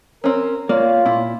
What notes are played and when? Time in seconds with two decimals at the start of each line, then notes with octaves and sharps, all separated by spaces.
0.24 C4 C#4 A#4
0.69 A#3 F4 C#5 D5
1.06 A#2 E4